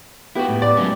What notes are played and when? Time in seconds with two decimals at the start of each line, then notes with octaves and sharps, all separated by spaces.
0.35 B3 E4 F#4 G4 B4
0.49 A2
0.62 D5
0.77 F#3 G#3 C#4